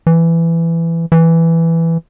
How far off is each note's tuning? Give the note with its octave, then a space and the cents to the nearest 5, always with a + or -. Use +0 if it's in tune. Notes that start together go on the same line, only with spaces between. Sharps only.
E3 +15
E3 +5